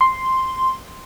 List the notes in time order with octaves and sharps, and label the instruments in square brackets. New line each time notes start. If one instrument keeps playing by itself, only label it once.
[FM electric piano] C6